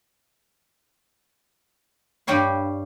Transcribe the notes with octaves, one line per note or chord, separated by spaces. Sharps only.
G2 G3 G4 C#5 F5